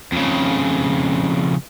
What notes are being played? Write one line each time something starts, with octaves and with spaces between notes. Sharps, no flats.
F2 C#3